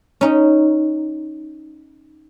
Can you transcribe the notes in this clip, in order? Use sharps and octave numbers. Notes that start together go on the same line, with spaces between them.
C#4 D#4